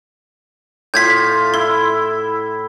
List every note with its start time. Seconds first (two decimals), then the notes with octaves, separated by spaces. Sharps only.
0.94 A2 F4 C6 G6 G#6 B6
1.54 E4 C6